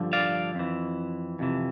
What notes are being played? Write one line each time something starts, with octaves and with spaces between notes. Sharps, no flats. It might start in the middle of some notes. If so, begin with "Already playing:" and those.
Already playing: G2 D3 F3
D5 F5
F2 E3
F2 C3 E3